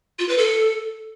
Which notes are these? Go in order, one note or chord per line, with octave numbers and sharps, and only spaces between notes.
F4
B4
A4